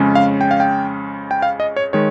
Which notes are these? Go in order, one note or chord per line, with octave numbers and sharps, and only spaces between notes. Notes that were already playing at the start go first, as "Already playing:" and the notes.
Already playing: F2 C#3 G#3 C#4
F5
G5
F5
G5
G5
F5
D#5
C#5
D#3 G#3 C#5